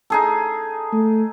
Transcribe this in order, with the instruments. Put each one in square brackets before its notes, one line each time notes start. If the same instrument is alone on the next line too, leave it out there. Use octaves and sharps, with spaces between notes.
[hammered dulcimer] D#4 G#4 A4
[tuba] A3